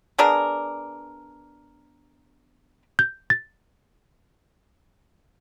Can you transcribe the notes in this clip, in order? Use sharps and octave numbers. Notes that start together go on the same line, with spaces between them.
B3 D4 G#4 A#4
G6
A6